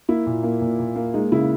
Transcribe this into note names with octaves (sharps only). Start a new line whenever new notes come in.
A#3 E4
A#2
A#3
A#2
A#2
A#3
G#3 D#4
C#3 E4